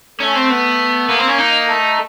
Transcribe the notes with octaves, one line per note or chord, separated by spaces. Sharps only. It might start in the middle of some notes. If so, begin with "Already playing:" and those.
A3 C#4
C4
B3
A#3 B3
C4
C#4
D#4
A3